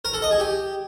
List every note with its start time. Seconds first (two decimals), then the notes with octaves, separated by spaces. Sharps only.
0.05 A#4
0.13 A4
0.22 D#5
0.31 G#4
0.40 G4